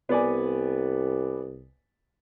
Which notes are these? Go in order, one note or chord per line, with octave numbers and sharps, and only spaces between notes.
C2 B3 D5 G#5